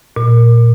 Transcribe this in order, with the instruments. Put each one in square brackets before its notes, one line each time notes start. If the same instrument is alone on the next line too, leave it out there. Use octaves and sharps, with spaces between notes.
[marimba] A#2